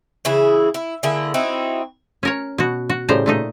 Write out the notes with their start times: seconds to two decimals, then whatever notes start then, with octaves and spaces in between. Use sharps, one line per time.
0.25 C#3 E3 E4 G#4
0.74 E4
1.03 D3 A#3 E4 G#4
1.34 C4 D#4 E4 F#4
2.23 C#4 A#4 C#5
2.58 B2 F#4
2.89 F#4
3.09 A2 C#3 G3 C5 A#5
3.26 A#2 A3 D#4